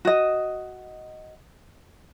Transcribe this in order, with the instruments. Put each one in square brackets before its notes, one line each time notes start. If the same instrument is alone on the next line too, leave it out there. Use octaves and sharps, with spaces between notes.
[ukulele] F#4 D#5